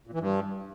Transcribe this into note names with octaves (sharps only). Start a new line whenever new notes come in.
A#2
E3
G2